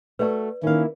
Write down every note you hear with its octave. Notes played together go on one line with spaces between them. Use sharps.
A3 F#4 A4 B4 D5
D#3 A#3 C#4 E4 F5